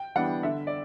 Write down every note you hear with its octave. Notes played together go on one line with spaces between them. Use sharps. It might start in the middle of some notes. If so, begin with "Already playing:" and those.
Already playing: G5
E3 G3 B3 D4 F#5
D3 E5
D5